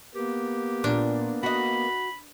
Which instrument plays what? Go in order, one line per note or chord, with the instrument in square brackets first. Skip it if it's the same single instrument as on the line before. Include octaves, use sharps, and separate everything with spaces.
[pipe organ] A#3 B3 [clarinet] G4
[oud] A#2 [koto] D4
[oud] F#4 D#5 [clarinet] B5